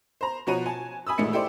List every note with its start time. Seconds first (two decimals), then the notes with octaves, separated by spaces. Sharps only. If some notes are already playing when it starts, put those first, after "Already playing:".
0.21 C5 A#5
0.47 B2 F3 F#4 C#5 A#5 D#7
0.66 G#5 A5
1.07 G#5 B5 D#6 E6
1.18 A1 A#2 D#3 G#3 A3 C#7
1.32 E4 G4 A4 C5 D5